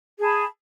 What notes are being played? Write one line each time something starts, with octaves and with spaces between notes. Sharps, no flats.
G#4 A5 B5